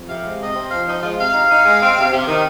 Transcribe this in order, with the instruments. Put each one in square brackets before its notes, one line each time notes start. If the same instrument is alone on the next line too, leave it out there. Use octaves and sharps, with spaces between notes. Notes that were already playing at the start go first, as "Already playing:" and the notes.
Already playing: [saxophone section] F2
C3 F5
G#3
C3 D#5
C4
F3 F5
F3 D#4
G#3 F4
C3 F5
D#4
D#4
G#3
C4
C3
C3
D#3